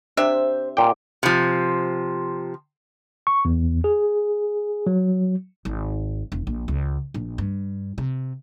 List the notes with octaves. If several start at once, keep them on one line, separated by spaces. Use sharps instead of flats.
C3 D4 C5 E5
A#2 G5 D6
C3 F3
C#6
E2
G#4
F#3
G#1
E1
A#1
C#2
A#1
G2
C3